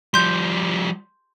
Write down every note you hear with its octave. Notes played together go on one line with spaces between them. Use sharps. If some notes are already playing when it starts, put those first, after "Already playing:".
F3 G3 C6 G6